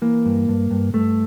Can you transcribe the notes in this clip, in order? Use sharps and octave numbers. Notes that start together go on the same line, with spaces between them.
E3 A#3
G2
G2
G2
G2 A3